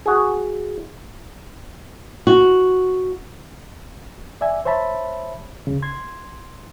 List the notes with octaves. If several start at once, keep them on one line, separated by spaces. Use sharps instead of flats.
F#4 G#4
F#4
D5 E5 G#5
C5 C#5 E5 A5 B5
D2 C#3
C6 G#6